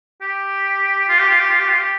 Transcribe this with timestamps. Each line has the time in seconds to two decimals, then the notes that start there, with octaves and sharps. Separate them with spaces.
0.21 G4
1.09 F4
1.19 G4
1.29 F4
1.40 G4
1.50 F4
1.60 G4
1.69 F4
1.79 G4